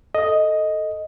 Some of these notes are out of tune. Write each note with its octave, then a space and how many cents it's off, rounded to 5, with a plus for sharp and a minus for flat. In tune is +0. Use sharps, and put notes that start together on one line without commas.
A4 +0 D#5 +0